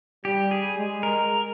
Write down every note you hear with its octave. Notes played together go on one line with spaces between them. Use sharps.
G3 G4
G#4
G#3
A#4